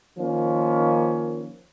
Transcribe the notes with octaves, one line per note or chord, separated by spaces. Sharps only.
D#3 F3 A#3 C#4